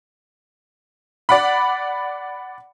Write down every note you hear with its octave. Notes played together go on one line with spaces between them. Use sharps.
D5 F#5 B5